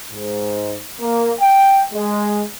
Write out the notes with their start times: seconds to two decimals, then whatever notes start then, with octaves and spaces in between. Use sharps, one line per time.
0.12 G#2
1.00 A#3
1.39 G5
1.92 G#3